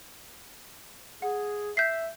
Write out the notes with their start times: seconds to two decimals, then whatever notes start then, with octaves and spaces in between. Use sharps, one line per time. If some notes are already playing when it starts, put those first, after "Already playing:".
1.22 G#4 F#5
1.77 E5 G6 B6 C7